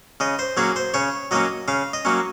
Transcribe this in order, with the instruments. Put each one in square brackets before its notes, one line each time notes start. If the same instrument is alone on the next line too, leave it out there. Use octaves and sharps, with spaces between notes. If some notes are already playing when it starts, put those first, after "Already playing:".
[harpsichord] C#3 D#5
C5
F#3 A#3 C#4 G#4
C5
C#3 C#5
F#3 A#3 C#4 D#5
C#3 F5
D#5
F#3 A#3 C#4